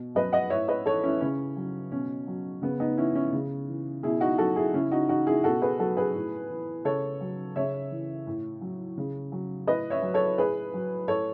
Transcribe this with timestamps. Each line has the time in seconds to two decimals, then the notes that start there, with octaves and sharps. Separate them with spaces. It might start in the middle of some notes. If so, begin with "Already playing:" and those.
Already playing: B2
0.15 F#3 B4 D#5
0.33 D#5 F#5
0.50 A2 C#5 E5
0.68 B4 D#5
0.86 E3 A4 C#5
1.03 C#4 E4
1.21 C#3 C#4
1.56 F#3
1.91 B2 C#4
2.27 F#3
2.62 C#3 B3
2.80 B3 D#4
2.97 E3 C#4 E4
3.15 C#4 E4
3.33 C#3
3.69 E3
4.03 B2 E4 G#4
4.20 D#4 F#4
4.38 F#3 F#4 A4
4.56 E4 G#4
4.74 C#3 C#4 E4
4.92 D#4 F#4
5.08 E3 D#4 F#4
5.27 E4 G#4
5.44 B2 F#4 A4
5.62 G#4 B4
5.79 F#3 F#4 A4
5.97 G#4 B4
6.14 A2
6.50 E3
6.85 C#3 A4 C#5
7.21 F#3
7.56 C#3 C#5 E5
7.91 E3
8.27 A2
8.61 F#3
8.97 C#3
9.32 F#3
9.67 A2 B4 D#5
9.90 C#5 E5
10.02 F#3
10.14 A4 C#5
10.38 A2 G#4 B4
10.74 F#3
11.08 A2 A4 C#5